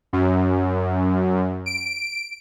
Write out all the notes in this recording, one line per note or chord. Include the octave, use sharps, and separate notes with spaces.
F#2
D7